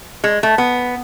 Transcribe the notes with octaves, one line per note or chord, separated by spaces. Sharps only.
G#3
A3
B3